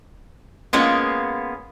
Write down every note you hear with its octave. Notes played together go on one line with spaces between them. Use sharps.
G#3 A#3 B3 C#4 F4